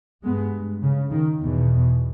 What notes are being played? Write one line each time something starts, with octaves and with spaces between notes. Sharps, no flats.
G2 G#3 B3
C#3
D#3
E2 B2